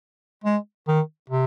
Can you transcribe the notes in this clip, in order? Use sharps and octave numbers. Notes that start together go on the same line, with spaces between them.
G#3
D#3
C3